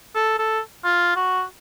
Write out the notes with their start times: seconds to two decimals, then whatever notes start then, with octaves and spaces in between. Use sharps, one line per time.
0.15 A4
0.39 A4
0.84 F4
1.16 F#4